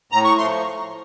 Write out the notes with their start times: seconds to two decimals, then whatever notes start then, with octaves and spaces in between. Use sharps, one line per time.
0.12 A2 A#5
0.24 C#6
0.37 F3 A3 C6